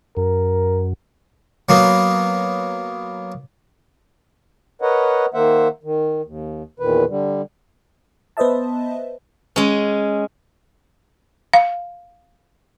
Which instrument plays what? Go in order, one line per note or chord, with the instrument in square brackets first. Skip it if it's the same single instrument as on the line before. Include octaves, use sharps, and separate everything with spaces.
[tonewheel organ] F#2 [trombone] A#4
[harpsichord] F#3 A#3 B3
[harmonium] A#4 B4 C#5 D#5 F#5
D#3 A#3 C5 E5 F#5
D#3
D#2
E2 A#2 D#3 B4
D3 G3
[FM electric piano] B3 B4 C5 D#5 E5 A5
[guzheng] G#3 C#4
[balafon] F5